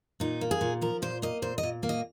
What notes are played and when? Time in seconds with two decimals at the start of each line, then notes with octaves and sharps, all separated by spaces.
0.20 A#2 D#4
0.41 A#3
0.51 G#4
0.61 A#2
0.81 F3 A#4
1.02 A#2 C5
1.22 A#3 D#5
1.42 A#2 C5
1.58 D#5
1.63 A#2
1.83 A#3
1.89 D#5